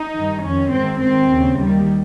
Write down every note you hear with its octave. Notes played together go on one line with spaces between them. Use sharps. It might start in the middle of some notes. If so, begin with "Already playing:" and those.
Already playing: D#4
G2 D#3
F2 D#3 C#4
G#2 D#3 C4
G#2 D#3 C4
D#2 C#3
D#2 D#3 G3